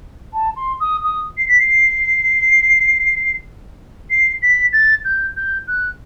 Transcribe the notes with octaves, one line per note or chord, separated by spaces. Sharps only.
A5
C6
D#6
D#6
C7
B6
C7
C7
B6
A6
G6
G6
F#6